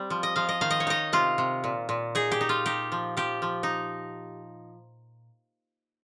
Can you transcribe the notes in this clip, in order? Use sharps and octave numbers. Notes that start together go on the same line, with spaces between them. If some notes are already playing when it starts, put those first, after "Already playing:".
Already playing: G3 C4
F3
D#5
F3 F5
D#5
D#3 F5
D#5
C#5
D#4 D#5
C3 F4
C3
A#2
A#2
D#4 G#4
G4
D#4
F4
D#4 G4
F3
F3 G4
F3
D#4